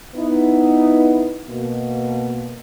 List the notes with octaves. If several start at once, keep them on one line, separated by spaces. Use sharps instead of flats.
B3 D#4 E4
B2 A#3